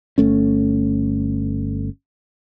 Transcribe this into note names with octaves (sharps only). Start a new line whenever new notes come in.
G1 A3 C#4